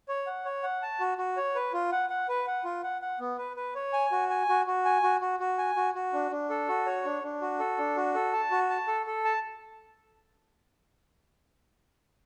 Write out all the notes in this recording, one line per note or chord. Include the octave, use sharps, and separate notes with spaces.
C#5
F#5
C#5
F#5
A5
F#4
F#4
C#5
B4
F4
F#5
F#5
B4
F#5
F4
F#5
F#5
B3
B4
B4
C#5
G#5
F#4
G#5
F#4
F#4
G#5
F#4
F#4
F#4
G#5
F#4
F#4
D4
D4
A4
F#4
C#5
D4
D4
F#4
A4
D4
F#4
A4
A5
F#4
A5
A4
A4
A5